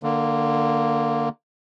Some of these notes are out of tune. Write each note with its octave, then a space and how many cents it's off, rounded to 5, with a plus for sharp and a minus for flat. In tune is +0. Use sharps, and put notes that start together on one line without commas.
D3 +25 A#3 +0